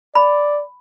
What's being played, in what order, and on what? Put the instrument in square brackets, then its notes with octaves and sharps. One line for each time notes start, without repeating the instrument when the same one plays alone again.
[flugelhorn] D5 [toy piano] B5